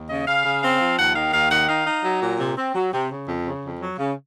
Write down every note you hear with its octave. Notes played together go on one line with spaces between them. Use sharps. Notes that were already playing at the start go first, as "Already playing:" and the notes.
Already playing: D#2
C#3 D#5
C#3 F5
C#3
C4 F5
F3
D#2 F#5
D#3 F5
D#2 F5
D#3 F#5
D#4 F5
D#4
F#3
A#2
C3
C4
F#3
C3
C#3
F2
C#3
F2
F#3
C#3